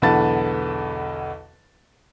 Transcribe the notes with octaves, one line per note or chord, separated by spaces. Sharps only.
B1 E2 D3 B4 A5 A6